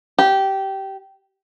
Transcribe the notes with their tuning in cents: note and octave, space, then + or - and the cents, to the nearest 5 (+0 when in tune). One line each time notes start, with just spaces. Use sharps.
G4 -15